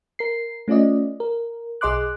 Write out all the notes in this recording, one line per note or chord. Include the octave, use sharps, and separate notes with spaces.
A#4 C7
A3 C#4 F4 D5 D#5
A#4
B1 G#4 D#5 C6 D6 F#6